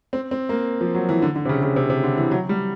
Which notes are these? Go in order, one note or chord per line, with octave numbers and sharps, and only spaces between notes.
C4
C4
A#3
F3
F#3
E3
D3
D3
C3
C#3
C#3
C3
C3
D3
E3
F#3
G3